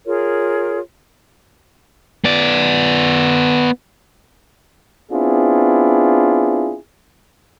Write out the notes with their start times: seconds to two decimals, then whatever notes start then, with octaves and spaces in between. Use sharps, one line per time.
0.06 F4 G#4 A#4 C#5
2.24 B3 D5
5.11 B3 C4 D4 E4 F4 G#4